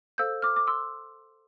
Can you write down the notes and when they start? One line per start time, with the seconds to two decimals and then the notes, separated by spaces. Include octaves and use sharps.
0.18 A4 C5 F5 E6 G6
0.42 D6 F6
0.56 D6
0.67 C6 E6